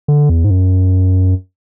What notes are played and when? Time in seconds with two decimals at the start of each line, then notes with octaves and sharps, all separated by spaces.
0.08 D3
0.29 E2
0.45 G#2
0.50 F#2